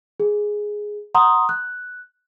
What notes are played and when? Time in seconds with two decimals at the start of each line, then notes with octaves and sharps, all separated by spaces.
0.20 G#4
1.15 F#5 A#5 C6 D#6
1.49 F#6